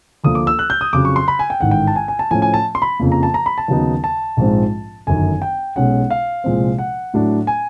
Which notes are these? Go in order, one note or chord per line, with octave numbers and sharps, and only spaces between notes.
D2 D3 F3 A#3 D#6
D6
E6
F#6
G6
D#6
F2 C#3 F#3 D6
C#6
C6
B5
G#5
G5
A1 G#2 D#3 F#5
G5
A5
G#5
G#5
A5
A2 F3 A3 C#4 G#5
G#5
A5
C6
B5
F2 C#3 F3 A#3
A#5
A5
A#5
B5
A5
D#2 C#3 F#3 B3 D#4
A5
A#1 G#2 F3 G#3 C4
G1 F#2 D#3 G#5
G5
B1 B2 G#3 C#4 F#5
F5
C2 A#2 F3 G#3 C4
F#5
A2 F#3 A3 D4
G#5